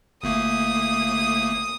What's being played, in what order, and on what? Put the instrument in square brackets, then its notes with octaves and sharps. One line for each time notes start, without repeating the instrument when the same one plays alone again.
[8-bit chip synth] G1 A3 A#3 [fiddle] D#6